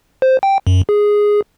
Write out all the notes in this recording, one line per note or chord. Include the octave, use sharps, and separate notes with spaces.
C5
G5
F#2
G#4